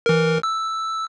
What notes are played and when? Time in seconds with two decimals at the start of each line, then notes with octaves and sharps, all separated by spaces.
0.06 E3 A#4
0.43 E6